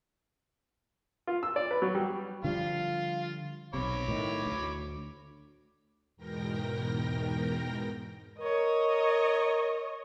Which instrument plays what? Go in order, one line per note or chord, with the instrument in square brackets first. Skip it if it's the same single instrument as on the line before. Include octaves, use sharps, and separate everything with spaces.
[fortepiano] F4
E6
D5
B4
F#3
G3
[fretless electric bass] D3 F3 G3 [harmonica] F4 F5
[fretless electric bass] B1 C3 [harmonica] C#5 B5 D6
[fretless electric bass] A2 D#3
D2
[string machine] E2 G#2 B2 A#4 G5 A#6
[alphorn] A#4 [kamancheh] C#5 D#5